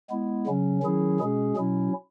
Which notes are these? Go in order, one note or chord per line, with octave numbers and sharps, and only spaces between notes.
G#3 B3 E4
C#3 F#3 C#4
D#3 F#3 C#4 E4 G#4
B2 G#3 C#4 G#4
B2 F#3 C#4 E4